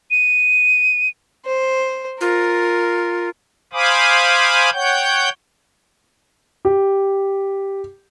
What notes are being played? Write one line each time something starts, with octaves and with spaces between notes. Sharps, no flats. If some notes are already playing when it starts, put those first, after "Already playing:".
D#7
C5
F4 A#4
C5 F5 G#5 B5 D6 D#6
C#5 F#5 G5 G6
G4